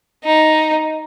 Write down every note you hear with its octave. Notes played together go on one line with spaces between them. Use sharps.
D#4